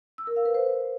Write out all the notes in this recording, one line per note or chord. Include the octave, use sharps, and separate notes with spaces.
E6
A#4
F5
B4
C5